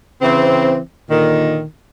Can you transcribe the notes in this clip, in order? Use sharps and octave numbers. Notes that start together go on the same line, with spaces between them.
C#3 E3 C4
A#2 D3 D#3